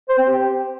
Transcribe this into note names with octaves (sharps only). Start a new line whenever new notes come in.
C5
C4
G4